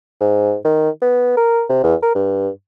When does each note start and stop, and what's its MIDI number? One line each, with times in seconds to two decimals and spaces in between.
0.21 0.56 44
0.65 0.89 51
1.02 1.37 59
1.37 1.64 70
1.70 1.79 48
1.84 1.95 40
2.02 2.12 70
2.15 2.49 43